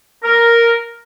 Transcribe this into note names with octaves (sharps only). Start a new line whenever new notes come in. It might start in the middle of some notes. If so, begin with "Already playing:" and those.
A#4